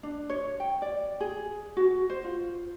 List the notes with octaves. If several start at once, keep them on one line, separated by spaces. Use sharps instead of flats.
D4
C#5
G5
D5
G#4
F#4
C5
F4